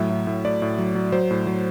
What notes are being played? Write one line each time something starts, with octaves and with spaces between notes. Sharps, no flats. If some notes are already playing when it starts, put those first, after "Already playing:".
Already playing: A2 F#3 E5
A2
A2
A2 D5
A2
F#3
F#3
F#3 C5
A2
F#3